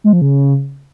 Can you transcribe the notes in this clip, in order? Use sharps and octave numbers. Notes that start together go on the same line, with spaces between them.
G#3
F3
C#3